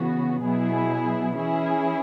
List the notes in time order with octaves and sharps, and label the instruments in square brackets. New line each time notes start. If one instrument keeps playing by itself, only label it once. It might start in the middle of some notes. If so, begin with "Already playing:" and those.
Already playing: [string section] C#3 E3 B3 F#4
B2 F#3 B3 E4 G#4
E3 C#4 E4 G#4